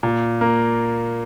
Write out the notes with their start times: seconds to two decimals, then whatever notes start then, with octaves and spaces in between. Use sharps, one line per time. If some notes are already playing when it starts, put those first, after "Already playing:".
0.03 A#2
0.41 A#3